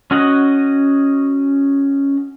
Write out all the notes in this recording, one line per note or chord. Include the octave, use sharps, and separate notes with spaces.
C#4 F#4 D#5 F#5